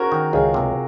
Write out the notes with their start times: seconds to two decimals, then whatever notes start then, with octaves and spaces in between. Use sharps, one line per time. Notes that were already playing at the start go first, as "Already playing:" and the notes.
Already playing: C#4 F#4 G#4 A#4 C5
0.12 D#3
0.33 C#2 F4 G#4
0.54 C3